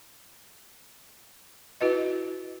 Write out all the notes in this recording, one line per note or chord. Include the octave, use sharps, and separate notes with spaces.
E4 F#4 B4 D#5